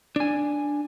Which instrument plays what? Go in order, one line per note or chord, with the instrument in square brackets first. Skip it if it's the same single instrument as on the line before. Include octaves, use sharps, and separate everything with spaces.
[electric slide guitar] D4 G#5